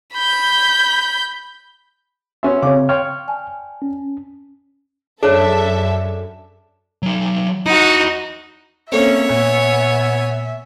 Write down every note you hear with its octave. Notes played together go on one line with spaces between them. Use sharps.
B5 G6
B3 C#4 F#4 E5 G#5 C6
C#3 C4 C#5 F5 D6
C#5 G5 C6 F6
D5 G#5 A5
C#4
F#2 D4 G#4 A4 C#5 E5 A5
F#3 D#4
D#4 E4 F#4 F#5
A#3 C4 C#4 A4 C#5 E5
A#2 B3 G#5